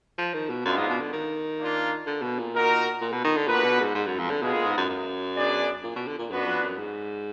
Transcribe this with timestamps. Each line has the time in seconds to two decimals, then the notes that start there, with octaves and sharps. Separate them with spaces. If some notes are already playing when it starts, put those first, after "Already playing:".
0.18 F3
0.34 D#3
0.50 B2
0.65 F#2 G#3 B3 D4 F4
0.77 G#2
0.90 B2
1.01 D3
1.13 D#3
1.59 A#3 D4 F4
2.07 D3
2.22 B2
2.39 A#2
2.54 D#4 F#4 A#4
3.01 A#2
3.13 B2
3.24 D#3
3.37 D3
3.47 A#2 B3 D4 F#4 B4
3.64 B2
3.79 G#2
3.95 G#2
4.07 F#2
4.19 F2
4.31 D3
4.42 B2 G#3 B3 F4 G#4
4.53 A#2
4.65 G#2
4.77 F#2
4.89 F#2
5.36 B3 D4 G#4 D5
5.83 A#2
5.96 B2
6.07 D3
6.18 A#2
6.30 F#2 B3 D4 F#4 B4
6.46 F2
6.62 F#2
6.78 G#2